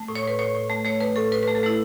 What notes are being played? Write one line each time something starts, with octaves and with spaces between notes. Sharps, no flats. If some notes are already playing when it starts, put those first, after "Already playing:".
Already playing: A3
A2
C#5
A2 B4
A2 C#5
A2
A3
A3 C#5
A3 B4
A2 A4
A2 B4
A3 B4
A4
A3 E4